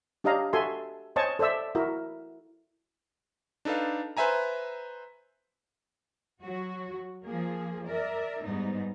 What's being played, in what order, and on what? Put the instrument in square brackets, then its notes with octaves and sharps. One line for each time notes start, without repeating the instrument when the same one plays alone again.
[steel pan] D4 G4 C#5 D#5 F5 A#5
F#4 A4 E5 G#5 C6
C5 C#5 D#5 G#5 A5 C#6
A4 C5 D5 E5 E6
E4 F#4 A#4 E5
[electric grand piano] D4 D#4 A4 B4 F5
B4 C5 E5 G#5 A#5
[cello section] F#3 F#4
F3 A#3 G#4
A#4 D5 E5
G#2 G3 B3 D#4